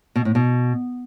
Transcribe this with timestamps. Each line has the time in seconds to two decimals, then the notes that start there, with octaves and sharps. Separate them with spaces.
0.16 B2
0.25 A2
0.35 B2